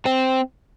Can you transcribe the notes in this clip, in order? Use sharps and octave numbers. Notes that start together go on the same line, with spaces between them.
C4